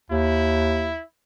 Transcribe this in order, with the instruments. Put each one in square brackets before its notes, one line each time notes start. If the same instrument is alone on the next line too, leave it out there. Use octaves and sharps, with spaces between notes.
[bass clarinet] D#2 [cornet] E4